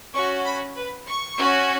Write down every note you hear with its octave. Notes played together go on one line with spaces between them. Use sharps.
C#4 F#4 C#6
B5
B4
C#6
C#4 F#4